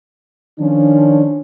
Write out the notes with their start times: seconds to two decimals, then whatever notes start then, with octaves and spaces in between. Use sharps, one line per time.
0.59 D#3 F3 C#4 D4